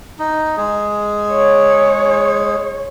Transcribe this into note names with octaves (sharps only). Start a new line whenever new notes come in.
D#4
G#3 G#4
C#5